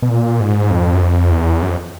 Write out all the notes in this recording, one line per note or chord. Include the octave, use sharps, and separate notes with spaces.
B2
A#2
G#2
F2
F#2
F2
E2
F#2
F2